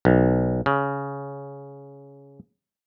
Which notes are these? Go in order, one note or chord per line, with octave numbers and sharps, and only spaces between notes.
B1
C#3